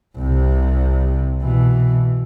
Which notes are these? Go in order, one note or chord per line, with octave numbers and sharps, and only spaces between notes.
C2 C3
B2 E3